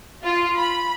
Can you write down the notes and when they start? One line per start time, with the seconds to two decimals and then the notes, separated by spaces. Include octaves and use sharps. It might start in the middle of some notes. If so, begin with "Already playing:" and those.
0.24 F4
0.57 B5